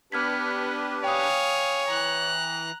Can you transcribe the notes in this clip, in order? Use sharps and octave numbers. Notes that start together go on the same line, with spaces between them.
B3 D4 G4 B4 F6 G#6 B6
G#4 C#5 F5 G5 D#6
E3 A#5 F#6